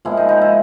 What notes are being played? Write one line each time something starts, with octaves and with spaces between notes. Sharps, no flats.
A#2 F3 G#3 B3 E4
D#4
D#4
E4